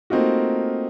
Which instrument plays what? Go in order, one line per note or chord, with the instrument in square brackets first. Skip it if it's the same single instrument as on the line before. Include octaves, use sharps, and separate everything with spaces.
[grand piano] A3 A#3 C4 D#4 F4 F#4